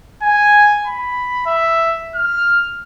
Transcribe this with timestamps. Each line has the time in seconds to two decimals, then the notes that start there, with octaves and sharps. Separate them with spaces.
0.22 G#5
0.87 B5
1.46 E5
2.15 F6